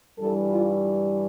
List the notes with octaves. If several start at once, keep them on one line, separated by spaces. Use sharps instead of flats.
G2 E3 G3 A4
F4